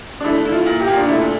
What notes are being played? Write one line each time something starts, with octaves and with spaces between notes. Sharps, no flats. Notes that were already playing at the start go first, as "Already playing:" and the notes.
D4
A3 E4
E4
F4
A#2
G4
A#2
D4
A3 E4